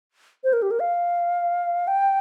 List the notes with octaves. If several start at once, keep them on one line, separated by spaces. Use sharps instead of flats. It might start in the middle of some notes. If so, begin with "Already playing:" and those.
C5
A#4
G4
A#4
F5
G5